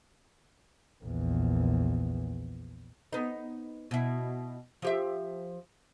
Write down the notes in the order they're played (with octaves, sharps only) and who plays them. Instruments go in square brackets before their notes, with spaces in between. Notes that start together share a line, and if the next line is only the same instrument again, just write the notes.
[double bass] A#1 E2
[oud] B3 D#4
B2 E4
F3 G4 E5